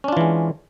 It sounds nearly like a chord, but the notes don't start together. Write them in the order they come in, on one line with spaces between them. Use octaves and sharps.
C#4 D4 F4 E3 G#3